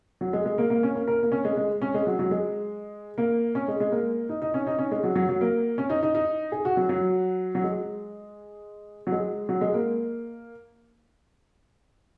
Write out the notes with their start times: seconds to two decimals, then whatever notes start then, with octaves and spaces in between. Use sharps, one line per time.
0.21 F#3
0.33 G#3
0.46 G#3
0.58 A#3
0.70 A#3
0.83 C#4
0.95 A#3
1.08 A#4
1.23 A#3
1.32 C#4
1.45 G#3
1.57 G#3
1.82 C#4
1.94 G#3
2.07 F#3
2.19 F#3
2.31 G#3
3.18 A#3
3.55 C#4
3.68 G#3
3.80 G#3
3.92 A#3
4.29 D#4
4.42 D#4
4.54 C#4
4.67 D#4
4.79 C#4
4.91 G#3
5.03 F#3
5.16 F#3
5.29 F#3
5.41 A#3
5.78 C#4
5.90 D#4
6.03 D#4
6.15 D#4
6.52 G#4
6.65 F#4
6.77 F#3
6.89 F#3
7.55 F#3
7.64 G#3
9.07 F#3
9.12 G#3
9.49 F#3
9.61 G#3
9.74 A#3